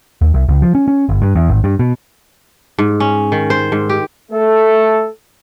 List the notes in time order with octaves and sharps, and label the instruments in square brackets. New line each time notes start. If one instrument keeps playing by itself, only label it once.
[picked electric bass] D#2
C2
C#2
F3
C#4
C#4
G1
G2
E2
G#1
G2
B2
[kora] G#2
C#4
D#3
C5
G#2
G4
[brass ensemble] A3 A4